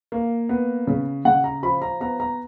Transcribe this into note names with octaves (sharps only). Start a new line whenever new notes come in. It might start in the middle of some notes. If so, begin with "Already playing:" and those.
A#3
B3
C#3
C#3 F#5
A#5
F3 B5
A#5
B3 A#5
A#5